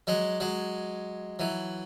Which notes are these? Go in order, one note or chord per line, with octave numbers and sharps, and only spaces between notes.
F#3 G#3
F#3 G#3
E3 F#3